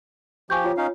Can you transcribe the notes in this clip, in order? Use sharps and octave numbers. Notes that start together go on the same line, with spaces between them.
F3 G4 G#5 C#6 G6
F4 C#5
C#4 D#4 F5